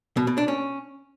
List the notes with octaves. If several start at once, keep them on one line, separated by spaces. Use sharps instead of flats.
B2
B2
D4
C#4